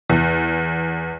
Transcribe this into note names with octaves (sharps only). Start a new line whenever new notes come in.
E2